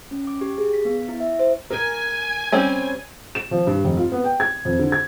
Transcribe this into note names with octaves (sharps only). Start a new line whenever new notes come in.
C#4
D6
G4
G#4
B6
B3
E4
E5
C5
A#4 G#5
G3 C4 C#4
E7
F3
G2
F1
F4
B3
G5
G#6
F2
D3
G#6